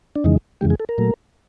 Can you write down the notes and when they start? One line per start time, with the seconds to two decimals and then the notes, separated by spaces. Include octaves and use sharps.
0.16 D4
0.24 F2 C#3 E3 G#3 D#4
0.61 F2 C#3 E3 G#3 G4
0.70 G#4
0.80 A4
0.89 A#4
0.98 A#2 F#3 A3